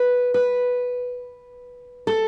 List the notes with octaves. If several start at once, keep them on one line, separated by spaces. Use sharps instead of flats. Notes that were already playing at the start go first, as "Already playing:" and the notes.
Already playing: B4
B4
A4